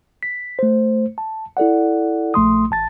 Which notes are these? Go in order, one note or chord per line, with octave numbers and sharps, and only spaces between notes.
B6
A3 C5
A5
E4 A4 D5 F#5
A#1 A3 C6 D#6
A1 A5 A6